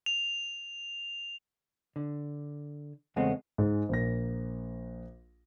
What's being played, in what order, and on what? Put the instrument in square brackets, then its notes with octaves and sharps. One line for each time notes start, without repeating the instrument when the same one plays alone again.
[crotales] F7
[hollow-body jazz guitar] D3
E2 C#3 G#3 A3 B3 C4
[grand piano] G#2 G#3
A#1 A#3 A#6